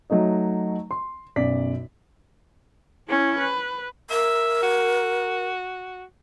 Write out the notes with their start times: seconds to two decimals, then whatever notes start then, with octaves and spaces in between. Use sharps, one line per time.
0.10 F#3 A3 D#4 D#5
0.91 C6
1.36 B1 F#2 D5 B6
3.08 C#4 E4
3.39 B4
4.10 A#4 E5
4.63 F#4